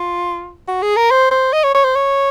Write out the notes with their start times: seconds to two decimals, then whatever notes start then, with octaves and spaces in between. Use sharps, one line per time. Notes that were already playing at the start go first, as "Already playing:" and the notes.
Already playing: F4
0.68 F#4
0.82 G#4
0.97 A#4
1.11 C5
1.31 C5
1.53 D#5
1.64 C#5
1.74 C#5
1.84 C5
1.95 C#5